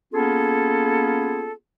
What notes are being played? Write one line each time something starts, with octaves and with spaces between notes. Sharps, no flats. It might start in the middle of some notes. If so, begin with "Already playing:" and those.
A#3 B3 C#4 F4 G#4 A4